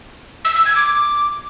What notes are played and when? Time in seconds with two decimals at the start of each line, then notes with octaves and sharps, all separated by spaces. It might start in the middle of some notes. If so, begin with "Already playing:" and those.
0.45 E6
0.55 E6
0.66 G#6
0.76 D6